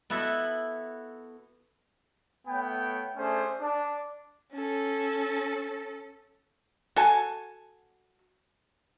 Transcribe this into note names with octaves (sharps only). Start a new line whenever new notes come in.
B3 E4 F#4 A4 E5
A3 B3 C#5 G5
A3 C#4 D4 G#4 C5
D4
C#4 A4
F#4 A4 G#5 A5